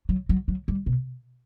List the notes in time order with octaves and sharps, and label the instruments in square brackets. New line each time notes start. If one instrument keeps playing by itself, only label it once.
[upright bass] F#3
F#3
F#3
G3
B2